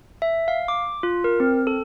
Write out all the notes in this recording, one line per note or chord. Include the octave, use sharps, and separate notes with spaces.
E5
F5
D6
F4
A#4
C4
A4